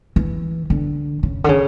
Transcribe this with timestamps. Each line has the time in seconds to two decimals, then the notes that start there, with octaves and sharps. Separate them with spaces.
0.16 E3
0.70 D3
1.23 C#3
1.44 D3
1.49 C#3